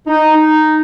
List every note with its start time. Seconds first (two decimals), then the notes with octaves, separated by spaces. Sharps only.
0.07 D#4
0.36 D#4